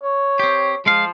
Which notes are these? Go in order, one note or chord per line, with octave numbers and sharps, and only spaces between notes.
C#5
C4 G4
F3 G#3 F4 F5